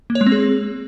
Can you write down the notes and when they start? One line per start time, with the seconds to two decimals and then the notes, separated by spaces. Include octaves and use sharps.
0.10 A#3
0.15 C#5
0.21 G#3
0.26 C4
0.32 G#4